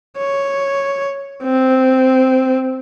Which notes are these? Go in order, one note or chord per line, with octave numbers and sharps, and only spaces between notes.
C#5
C4